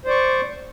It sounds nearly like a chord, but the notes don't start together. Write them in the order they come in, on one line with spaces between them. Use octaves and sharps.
C5 D5 C#6